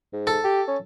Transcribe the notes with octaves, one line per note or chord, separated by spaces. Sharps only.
G#2
A4
G4
C#4